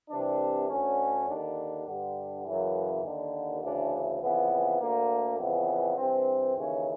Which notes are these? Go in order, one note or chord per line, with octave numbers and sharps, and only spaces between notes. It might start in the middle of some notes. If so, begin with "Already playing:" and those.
C2 C3 E3 D4
D2 D3 C#4
D#2 D3 D4
G2 D3
F#2 C#3 E3
D#2 D3
D2 C#3 E3 D4
F2 C#3 E3 B3
D2 D3 A#3
F2 C#3 E3 B3
G2 E3 C4
D#2 C#3 E3 C#4